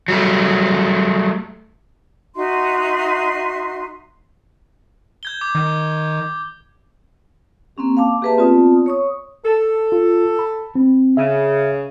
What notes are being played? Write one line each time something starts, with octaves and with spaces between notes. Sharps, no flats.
F#3 G3 A3
D#4 F#4 E5 C6
G6 G#6 G7
D6
D#3
A#3 C4 C#4 G4
F5 A5 D6
A#3 G4 G#4 B4 E5 A5
B3 C4 F4 D5 A5 D#6
C#5 C#6 D#6
A4
F4
B5
C4
C#3 E5